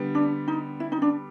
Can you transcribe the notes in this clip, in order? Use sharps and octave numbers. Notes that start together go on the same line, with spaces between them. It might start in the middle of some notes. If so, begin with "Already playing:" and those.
Already playing: D3 G3 B3
D4
D#4
E4
D#4
D4